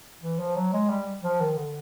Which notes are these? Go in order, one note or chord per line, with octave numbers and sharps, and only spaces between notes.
E3
F3
F#3
G#3
G3
F3
D#3
D3